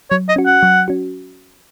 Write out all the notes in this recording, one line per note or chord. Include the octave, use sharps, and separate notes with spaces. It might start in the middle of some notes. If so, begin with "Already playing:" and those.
F#3 C#5
D#5
C#4 F#4
F#5
F#3
C#4 F#4